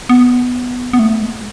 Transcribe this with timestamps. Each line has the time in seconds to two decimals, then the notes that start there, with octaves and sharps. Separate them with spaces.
0.09 B3
0.93 B3
0.99 A3
1.21 G#3